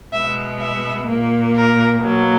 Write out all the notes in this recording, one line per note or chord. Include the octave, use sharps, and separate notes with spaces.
B2 G#3 B3 E5
E5
A#2 A#3
A#4
B2 F#3 A#3